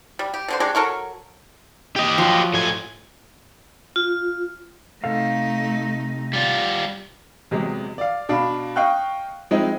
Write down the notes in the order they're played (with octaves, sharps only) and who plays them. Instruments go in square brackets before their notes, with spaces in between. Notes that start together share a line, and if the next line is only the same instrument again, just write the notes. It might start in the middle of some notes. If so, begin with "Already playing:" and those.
[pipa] G3
G4
B2 D3 C5
G#3 D4 F#4 G4
F#3 A4 A#4 C#6
[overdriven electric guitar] G4 D#5
[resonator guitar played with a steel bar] F3 F#3
[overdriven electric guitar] A2 G#5
[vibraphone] F4
[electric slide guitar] C3 A4 F5 [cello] A3 D#4
[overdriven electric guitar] G3 F4
[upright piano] E2 C3 F#3 G#3
D5 F5
B2 D4 F5 B5
D#5 F5 G5 C#6 F#6
F3 G#3 C4 D#4 E4